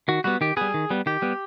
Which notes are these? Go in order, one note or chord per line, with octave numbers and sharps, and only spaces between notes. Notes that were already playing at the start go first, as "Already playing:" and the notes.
D#3 F#4
G3 B3 F#4
D#3 G4
G3 B3 G#4
D#3
G3 B3
D#3 G4
G3 B3